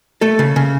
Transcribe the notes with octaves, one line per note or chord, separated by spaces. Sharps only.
A3 A4
C#3
C#3